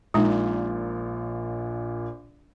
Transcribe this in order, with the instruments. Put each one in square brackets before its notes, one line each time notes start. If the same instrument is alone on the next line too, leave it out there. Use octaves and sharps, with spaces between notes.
[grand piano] A#1 A#2 [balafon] G#3 D#4